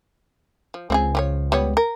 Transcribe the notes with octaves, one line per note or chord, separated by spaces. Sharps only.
F3
C#2 C4 F#4 G#4
F3 G4 C#5
G3 B3 C#5
A#4